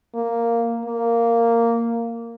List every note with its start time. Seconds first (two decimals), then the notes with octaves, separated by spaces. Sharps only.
0.15 A#3
0.86 A#3